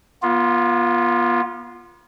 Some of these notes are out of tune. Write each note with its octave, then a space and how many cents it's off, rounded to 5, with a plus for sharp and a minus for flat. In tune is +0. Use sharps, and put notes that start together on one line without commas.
B3 -35 F4 +0